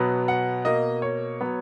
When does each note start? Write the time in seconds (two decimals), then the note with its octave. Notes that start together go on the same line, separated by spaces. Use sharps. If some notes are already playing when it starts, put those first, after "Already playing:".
Already playing: B2 F#3 B3
0.28 F#5
0.65 B2 A#3 D#5
1.02 C#5
1.41 F#3 B3